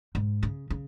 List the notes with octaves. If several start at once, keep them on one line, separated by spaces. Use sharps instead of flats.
G#2
C#3
C#3